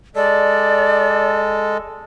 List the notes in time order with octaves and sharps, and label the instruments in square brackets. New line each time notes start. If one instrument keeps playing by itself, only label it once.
[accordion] G#3 A4 [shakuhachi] D5